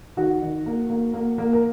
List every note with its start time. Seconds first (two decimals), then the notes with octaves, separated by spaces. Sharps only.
0.17 D#3 F#4
0.42 D#3
0.66 A#3
0.90 A#3
1.14 A#3
1.38 A#3
1.53 A#4